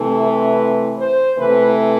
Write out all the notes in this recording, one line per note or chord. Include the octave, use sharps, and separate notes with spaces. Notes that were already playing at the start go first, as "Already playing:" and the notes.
Already playing: C3 E3 A3
B4
C5
C3 E3 A3 B4